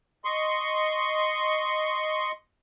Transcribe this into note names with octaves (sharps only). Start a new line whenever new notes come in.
D#5 C6 C#6